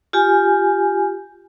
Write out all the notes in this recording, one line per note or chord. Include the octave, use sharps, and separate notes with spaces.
F4 G4 G#5